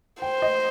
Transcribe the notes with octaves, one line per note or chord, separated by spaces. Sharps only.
C5 G5
D#5